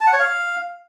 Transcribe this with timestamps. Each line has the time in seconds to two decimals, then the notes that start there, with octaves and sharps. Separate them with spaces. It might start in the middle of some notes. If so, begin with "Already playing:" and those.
0.01 A5
0.07 F#5
0.13 C#5
0.19 F5